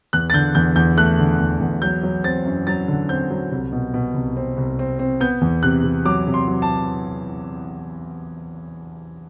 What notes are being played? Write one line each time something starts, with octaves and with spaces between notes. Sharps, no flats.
E2 F#6
A6
D3 G6
E2 G6
E2 G6
A3 F#6
D3
E2
E2
F#3 G6
F#3
C4 A6
F#2
F#3 A6
D3
C4 G6
F#3
C2
B2
B2
C2
C4
C2
C4
C4
B3 G6
E2
C3 F#6
C3
F#3 D6
C3
C6
F#3
A5